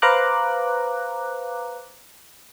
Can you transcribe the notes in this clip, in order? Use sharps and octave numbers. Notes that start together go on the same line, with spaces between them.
B4 C5 F5 A#5 D6 F#6